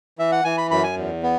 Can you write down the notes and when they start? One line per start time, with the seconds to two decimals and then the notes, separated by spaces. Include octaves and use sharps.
0.19 E3 E5
0.32 F#5
0.44 E3 G#5
0.58 B5
0.71 F#2 B5
0.84 G#5
0.97 E2
1.23 B3